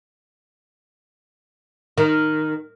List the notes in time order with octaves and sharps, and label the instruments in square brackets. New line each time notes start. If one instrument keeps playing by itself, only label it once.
[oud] D#3